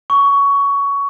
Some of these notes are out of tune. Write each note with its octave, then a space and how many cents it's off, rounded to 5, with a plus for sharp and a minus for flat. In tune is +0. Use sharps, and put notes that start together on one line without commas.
C#6 +15